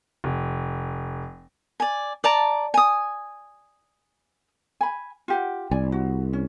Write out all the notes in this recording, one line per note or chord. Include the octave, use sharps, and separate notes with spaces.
F1
D5 G#5
D5 A5 A#5
G#5 D#6
G#5 B5
F4 G4 F#5
C2 D5 G#5
F#4
C#4